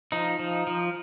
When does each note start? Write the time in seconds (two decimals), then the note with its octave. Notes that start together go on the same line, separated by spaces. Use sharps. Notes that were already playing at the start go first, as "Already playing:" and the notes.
0.12 F3 D#4
0.39 F3
0.67 F3